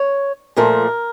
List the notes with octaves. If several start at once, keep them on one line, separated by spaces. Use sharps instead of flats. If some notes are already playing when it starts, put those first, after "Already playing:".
Already playing: C#5
A#2 F3 A3 A#4